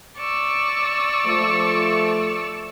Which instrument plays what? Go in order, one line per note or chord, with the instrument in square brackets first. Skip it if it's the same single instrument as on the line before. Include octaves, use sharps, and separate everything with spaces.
[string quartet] D5 C#6 E6
[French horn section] F3 A3